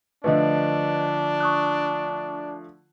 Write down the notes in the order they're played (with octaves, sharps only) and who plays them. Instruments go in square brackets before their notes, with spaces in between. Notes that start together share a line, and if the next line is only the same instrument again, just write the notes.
[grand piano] D3 F3 A3 [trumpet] D4 [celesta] B4 D#5
[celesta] C#6 D#6 F#6